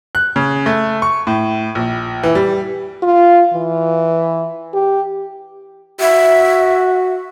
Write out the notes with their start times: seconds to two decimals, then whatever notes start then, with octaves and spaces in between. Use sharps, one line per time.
0.15 F#6
0.36 C#3
0.66 A3
1.02 C#6
1.27 A2
1.75 A#1
2.23 E3
2.35 G3
3.03 F4
3.53 E3
4.74 G4
6.00 F#4 E5